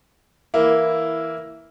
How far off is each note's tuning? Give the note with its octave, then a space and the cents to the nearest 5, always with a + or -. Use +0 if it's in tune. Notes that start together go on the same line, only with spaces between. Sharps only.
E3 -10 A#3 +0 E4 +0